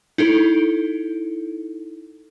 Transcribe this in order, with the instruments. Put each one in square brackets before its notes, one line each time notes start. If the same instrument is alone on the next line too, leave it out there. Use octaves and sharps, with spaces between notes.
[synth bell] D#4 E4 A4